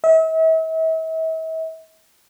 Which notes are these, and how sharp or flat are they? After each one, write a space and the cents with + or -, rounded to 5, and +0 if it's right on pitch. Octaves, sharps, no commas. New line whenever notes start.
E5 -40